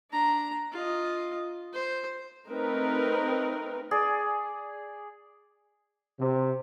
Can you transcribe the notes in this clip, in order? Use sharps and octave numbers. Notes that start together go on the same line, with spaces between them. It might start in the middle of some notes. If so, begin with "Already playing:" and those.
D4 A#5
F4 D#5
C5
A3 C4 D#4 A#4 B4
G#4 D5
C3